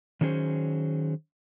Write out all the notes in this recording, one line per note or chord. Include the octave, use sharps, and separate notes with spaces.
D#3 F#3 C#4 G#4 C5